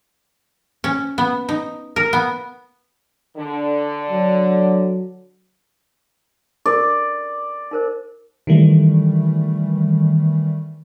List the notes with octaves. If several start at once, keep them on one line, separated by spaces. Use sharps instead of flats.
C#4
B3
D#4
A#4
B3
D3
F#3
A#4 D5
D#4 A#4 C5
D#3 E3 G3 A3